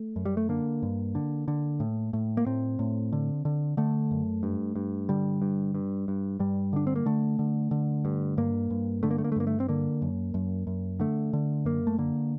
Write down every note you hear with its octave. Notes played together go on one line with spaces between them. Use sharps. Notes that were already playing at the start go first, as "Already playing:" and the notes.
Already playing: A3
F#2
G3
A3
D3 A#3
G2
D3
D3
A2
A2
A#3
A2 C4
A2
D3
D3
D3 A3
F#2
G2
G2
D3 G3
G2
G2
G2
G2 G3
D3 D4
C4
A#3
D3 A3
D3
D3
G2
G2 A#3
G2
D3 A3
A#3
A3
A#3
A3
G2 A#3
A3
C4
D3 A#3
F#2
F#2
F#2
D3 A3
D3
F#2 A#3
A3
D3 A#3